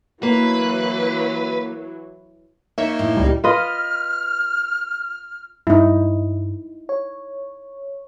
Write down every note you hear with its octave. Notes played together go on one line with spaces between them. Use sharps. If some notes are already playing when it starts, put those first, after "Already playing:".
E3 F#3 A#3 B4
A#3 D#4 C#5 E5
A2
C#2 A#2 G3
F4 B4 D#5 F6
G2 D#4 E4
C#5